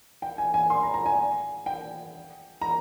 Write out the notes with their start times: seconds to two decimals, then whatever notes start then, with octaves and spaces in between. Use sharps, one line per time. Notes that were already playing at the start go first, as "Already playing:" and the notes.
0.22 G5
0.38 G#5
0.54 G#5
0.70 C6
0.83 A#5
0.94 A#5
1.06 G#5
1.66 G5
2.61 A#5